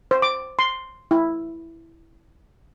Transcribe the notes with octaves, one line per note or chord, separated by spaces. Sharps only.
C5
D6
C6
E4